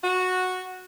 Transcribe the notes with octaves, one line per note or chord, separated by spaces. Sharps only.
F#4